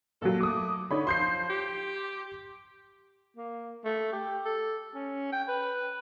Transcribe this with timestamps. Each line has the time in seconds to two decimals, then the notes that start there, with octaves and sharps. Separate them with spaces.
0.22 A#2 F#3 A4
0.41 A3 D6 D#6
0.91 D3 D#4 C#5 B5
1.07 F3 C6 G6 C7
1.50 G4
3.37 A#3
3.84 A3
4.12 G4
4.45 A4
4.94 C#4
5.32 G5
5.48 B4